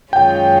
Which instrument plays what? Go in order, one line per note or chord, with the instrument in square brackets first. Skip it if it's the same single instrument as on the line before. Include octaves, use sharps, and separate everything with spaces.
[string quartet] F#2 D#3 G#3 C#4 F4 [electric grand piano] G5